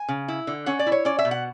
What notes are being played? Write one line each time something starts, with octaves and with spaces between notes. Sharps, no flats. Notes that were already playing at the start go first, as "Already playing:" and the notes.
Already playing: G#5
C#3
E4
D3
C#4 F#5
D5
E4
C#5
C#4 D5
E5
B2
F#5